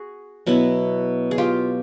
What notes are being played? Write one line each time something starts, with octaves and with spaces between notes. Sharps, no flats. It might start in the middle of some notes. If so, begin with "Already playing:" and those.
Already playing: F#4 G#4
B2 F#3 B3 E4
G#4
F4 G4